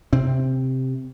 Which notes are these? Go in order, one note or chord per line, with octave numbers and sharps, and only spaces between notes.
C3 C4